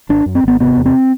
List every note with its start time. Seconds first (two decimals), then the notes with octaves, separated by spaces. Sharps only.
0.09 G#1 D4
0.26 F#2
0.35 C4
0.44 G#1 B3
0.60 C3 B3
0.77 E2
0.86 C4